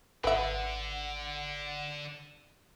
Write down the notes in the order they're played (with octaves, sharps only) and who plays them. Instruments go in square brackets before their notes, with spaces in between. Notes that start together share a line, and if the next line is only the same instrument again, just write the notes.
[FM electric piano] G#1 F#5 [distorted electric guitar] D3 [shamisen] B4 E5